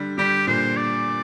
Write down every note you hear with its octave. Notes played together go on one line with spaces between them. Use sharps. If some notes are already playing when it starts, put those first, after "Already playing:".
Already playing: D3 G3
D3 G3 G4
A#2 D3 C5
D5